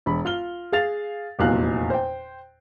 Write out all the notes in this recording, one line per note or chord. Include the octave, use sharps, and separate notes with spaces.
E1 B5
F4 F6 G7
G#4 F5 A6 F7
F1 E2 A#2 F#3 F5 F#6
C5 G5